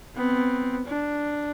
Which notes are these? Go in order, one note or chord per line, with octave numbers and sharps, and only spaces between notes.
B3 C4
D4